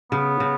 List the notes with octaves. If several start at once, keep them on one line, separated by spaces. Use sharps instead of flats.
C#3 B3
C#3